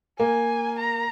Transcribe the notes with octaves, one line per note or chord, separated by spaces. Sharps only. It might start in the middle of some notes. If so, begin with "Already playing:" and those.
A#3 G#5
A#5